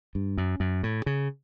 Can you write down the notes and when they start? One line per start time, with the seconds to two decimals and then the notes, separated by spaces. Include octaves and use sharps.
0.15 G2
0.38 F#2
0.60 F#2
0.83 A2
1.06 C#3